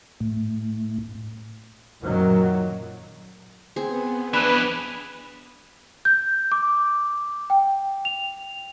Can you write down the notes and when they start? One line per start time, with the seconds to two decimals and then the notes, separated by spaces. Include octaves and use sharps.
0.20 A2
2.02 F#2 A#2 D#3 F#3
3.76 B3 C4 G#4
4.33 F2 E3 D4 B4
6.05 G6
6.52 D6
7.50 G5
8.05 F7